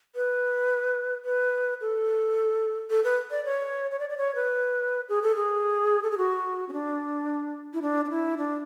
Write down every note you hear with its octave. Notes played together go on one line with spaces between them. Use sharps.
B4
B4
A4
A4
B4
D5
C#5
C#5
D5
D5
C#5
B4
G#4
A4
G#4
A4
G#4
F#4
C#4
D4
E4
D4
D4
E4
D4